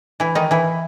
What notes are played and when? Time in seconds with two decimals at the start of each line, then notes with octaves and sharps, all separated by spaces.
0.20 E3 E4
0.35 D#3 D#4
0.51 E3 E4